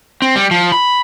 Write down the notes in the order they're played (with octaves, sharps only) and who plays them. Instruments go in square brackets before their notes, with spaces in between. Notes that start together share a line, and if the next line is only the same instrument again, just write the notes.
[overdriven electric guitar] C4
G3
F3
B5